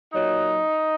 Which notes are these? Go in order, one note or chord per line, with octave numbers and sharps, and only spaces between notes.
A#2 F#3 D#4